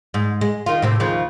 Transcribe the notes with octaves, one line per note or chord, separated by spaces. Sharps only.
G#2
G#3
D#3 F4
A2 C3 C4
D#2 C#3 F3